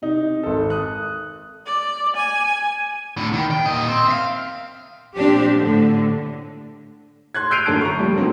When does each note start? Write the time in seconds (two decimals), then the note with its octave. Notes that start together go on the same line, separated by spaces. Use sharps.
0.02 C3 D#4
0.43 G#1 A4
0.70 D#6 F#6
1.66 D5
2.16 G#5
3.17 A2 D3
3.33 D#3
3.51 G5
3.66 A#2 D#5
3.88 C4
4.08 E5 F5
5.15 A#2 F3 C4 D4 G4
5.58 A2 D3
7.34 C6 F#6 G#6
7.51 E6 G6 C7 D7 D#7 F7
7.66 F#2 D3 A5 D7
7.81 A#5 C#6
7.99 F3 G3
8.14 D#2 A#2 D3 F#3 C4